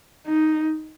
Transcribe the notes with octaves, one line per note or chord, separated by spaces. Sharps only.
D#4